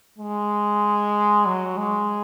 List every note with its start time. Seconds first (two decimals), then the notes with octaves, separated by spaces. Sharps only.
0.18 G#3
1.46 F#3
1.77 G#3